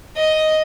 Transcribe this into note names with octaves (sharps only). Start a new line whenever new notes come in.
D#5